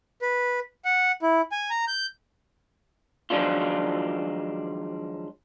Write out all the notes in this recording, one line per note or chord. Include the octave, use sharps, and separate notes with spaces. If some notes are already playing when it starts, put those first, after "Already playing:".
B4
F#5
E4
G#5
A#5
G6
D#3 F3 F#3 G#3 D4 F4